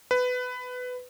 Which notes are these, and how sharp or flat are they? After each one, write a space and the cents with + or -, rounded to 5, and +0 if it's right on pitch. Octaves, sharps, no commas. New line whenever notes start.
B4 +15